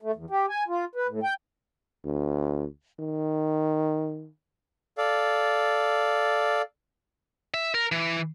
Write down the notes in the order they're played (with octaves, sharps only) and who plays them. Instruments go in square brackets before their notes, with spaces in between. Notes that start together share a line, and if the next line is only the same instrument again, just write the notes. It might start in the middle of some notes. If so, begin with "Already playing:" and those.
[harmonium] A3
E2
G4
G#5
F4
B4
A2
G5
[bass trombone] D2
D#3
[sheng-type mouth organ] A4 D5 F5
[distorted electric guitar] E5
A#4
E3